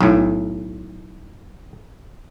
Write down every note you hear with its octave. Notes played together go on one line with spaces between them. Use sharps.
B1 A2